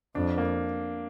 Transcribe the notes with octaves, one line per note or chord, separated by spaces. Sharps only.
F2 D4
A#3